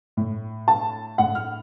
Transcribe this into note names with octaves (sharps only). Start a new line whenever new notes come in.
A2
A5
A2 F#5
F6